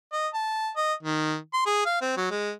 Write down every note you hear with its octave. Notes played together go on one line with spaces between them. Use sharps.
D#5
A5
D#5
D#3
C6
G#4
F5
C4
F#3
G#3